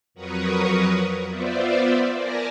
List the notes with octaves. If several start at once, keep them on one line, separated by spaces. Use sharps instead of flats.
F2 F#3 A#4 B4 C#6 D#6
B3 F4 C5 D5 E5
A#4 D5 G#5 A5 A#6